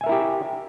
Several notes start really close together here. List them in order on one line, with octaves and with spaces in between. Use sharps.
G#5 E5 A#4 E4 G4